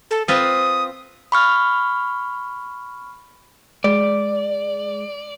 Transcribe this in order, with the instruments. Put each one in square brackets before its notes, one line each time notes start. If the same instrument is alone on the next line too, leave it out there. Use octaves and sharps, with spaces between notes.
[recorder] A4
[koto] C4 F4 B4 [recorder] D#6
[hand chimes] B5 C#6 F6
[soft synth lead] G#3 [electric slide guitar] D5